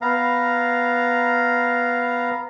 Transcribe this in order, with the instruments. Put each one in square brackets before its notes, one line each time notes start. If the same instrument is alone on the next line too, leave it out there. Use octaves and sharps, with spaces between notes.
[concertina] B3 F5 A#5